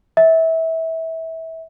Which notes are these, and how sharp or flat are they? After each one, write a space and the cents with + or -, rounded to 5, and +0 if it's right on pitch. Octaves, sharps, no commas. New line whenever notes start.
E5 -25